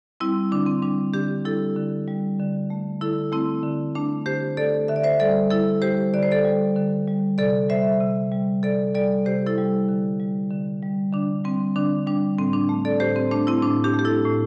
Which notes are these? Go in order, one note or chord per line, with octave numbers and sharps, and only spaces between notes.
G3 C4 E4
D3 D4
C4
G3 D4
D3 D4 G4
G3 E4 A4
D3
G3
D3
A3
D3 E4 A4
A3 C4 E4
D3
A3 D4
D3 G4 C5
A3 A4 D5
D3 E5
D5
C5 E5
G3 A4 D5
D3 E4 A4
G3 G4 C5
D3 D5
C5
A4 D5
G3
D3
G3
C3 A4 D5
G3 C5 E5
C3
G3
C3 A4 D5
G3 A4 D5
C3 G4 C5
E4 A4
G3
D3
G3
D3
G3
D3 D4
G3 C4
D3 D4
G3 D4
A2 C4
D4
A3
A4 D5
A2 G4 C5
C4
A3 D4
C4 E4
A2 D4
D4 G4
A3
G4
E4 A4
A2